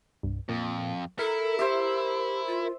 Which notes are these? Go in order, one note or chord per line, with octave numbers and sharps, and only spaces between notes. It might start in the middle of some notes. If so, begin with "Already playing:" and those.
C2 G2
F2 A#2
E4 A4 A#4
G4 C5 E5
F4